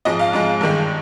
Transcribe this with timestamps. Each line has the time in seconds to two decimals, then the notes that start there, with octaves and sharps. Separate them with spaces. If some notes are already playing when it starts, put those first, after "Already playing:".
0.05 G#2 F3 G#3 D#5
0.19 F5
0.33 G#2 F3 G#3
0.61 G2 D#3 G#3